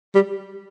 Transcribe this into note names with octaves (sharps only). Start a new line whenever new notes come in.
G3